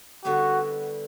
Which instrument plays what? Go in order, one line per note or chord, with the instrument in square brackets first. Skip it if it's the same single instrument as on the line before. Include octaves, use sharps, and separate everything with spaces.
[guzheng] D3 G3 B3 E4 [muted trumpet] F#4